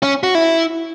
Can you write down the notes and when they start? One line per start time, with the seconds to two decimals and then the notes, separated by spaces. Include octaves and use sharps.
0.03 C#4
0.23 F#4
0.35 E4